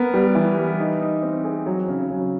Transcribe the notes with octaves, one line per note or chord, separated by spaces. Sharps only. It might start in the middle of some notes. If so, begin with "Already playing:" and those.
Already playing: B3 A#4
G3
E3
G3
D#4
D#4
C4
G#4
F#3
C#3
F#3